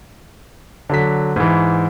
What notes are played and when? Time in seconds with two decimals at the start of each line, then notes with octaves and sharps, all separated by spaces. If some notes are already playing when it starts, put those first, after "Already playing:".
0.89 D3 F#3 B6
1.36 G#2 E3